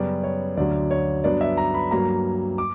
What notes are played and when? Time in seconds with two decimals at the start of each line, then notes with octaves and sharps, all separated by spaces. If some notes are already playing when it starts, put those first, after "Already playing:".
Already playing: F#2 C#3 G3 B3 D5
0.24 C#5
0.57 D2 D3 F#3 D5
0.91 C#5
1.24 G2 F#3 B3 D4 D5
1.41 E5
1.57 A#5
1.74 B5
1.91 G2 F#3 A#3 A#5
2.58 D6